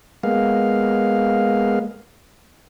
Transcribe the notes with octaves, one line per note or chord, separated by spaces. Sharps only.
G#3 A#3 B3 F5